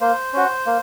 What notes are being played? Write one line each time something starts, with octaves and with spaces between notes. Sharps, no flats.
A#3 C5
C#4 F#4
A#3